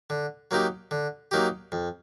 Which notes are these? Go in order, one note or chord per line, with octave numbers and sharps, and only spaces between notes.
D3
F#3 A#3 D#4 G4
D3
F#3 A#3 D#4 G4
F2